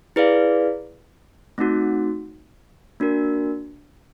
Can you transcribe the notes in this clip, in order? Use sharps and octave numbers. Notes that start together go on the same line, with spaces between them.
E4 G#4 B4 D5 F5
A3 C4 D#4 F#4
A#3 D4 F#4 A#4